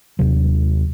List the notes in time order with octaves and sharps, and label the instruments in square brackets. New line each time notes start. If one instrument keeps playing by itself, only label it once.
[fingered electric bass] D#2 C3 F#3